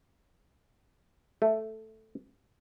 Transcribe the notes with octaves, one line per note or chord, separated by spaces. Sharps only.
A3